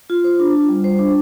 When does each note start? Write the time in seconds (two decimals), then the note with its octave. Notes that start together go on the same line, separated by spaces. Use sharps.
0.10 F4
0.24 C5
0.40 D4
0.54 F4
0.69 G3
0.84 C5
0.99 D4